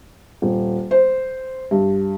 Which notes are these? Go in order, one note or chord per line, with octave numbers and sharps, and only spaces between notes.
D#1
C5
G2